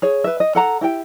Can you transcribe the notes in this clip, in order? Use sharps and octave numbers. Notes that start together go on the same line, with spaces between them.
G#4 C#5
B4 E5
D#5
A4 F#5 A#5
E4 G4 G5